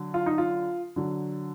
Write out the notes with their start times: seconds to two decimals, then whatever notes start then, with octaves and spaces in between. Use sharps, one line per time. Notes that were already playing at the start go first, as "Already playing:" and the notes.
Already playing: D3 F#3
0.14 F4
0.26 D#4
0.38 F4
0.96 D3 F#3